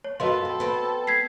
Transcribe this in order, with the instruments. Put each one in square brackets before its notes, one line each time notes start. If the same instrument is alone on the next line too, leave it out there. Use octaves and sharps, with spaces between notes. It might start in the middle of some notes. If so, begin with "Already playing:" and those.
[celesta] C#5
[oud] F#2 B3 F4 [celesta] F#4 D#5 C6 [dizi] A4
[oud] C4
B3 C4
[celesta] G#6 B6 C7